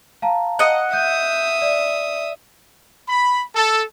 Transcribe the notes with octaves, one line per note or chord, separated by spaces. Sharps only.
F5 A5 A#5
D#5 F#5
E5 D#6 G6
D5
B5
A4